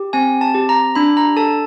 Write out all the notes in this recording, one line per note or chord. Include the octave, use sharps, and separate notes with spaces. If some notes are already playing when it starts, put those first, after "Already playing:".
Already playing: G4
C4 G#5
A5
G4
A#5
D4 B5
A#5
A4 A5